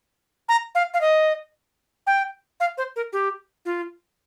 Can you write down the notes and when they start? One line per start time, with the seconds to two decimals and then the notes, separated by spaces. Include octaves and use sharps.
0.49 A#5
0.75 F5
0.94 F5
1.01 D#5
2.07 G5
2.60 F5
2.78 C5
2.96 A#4
3.13 G4
3.65 F4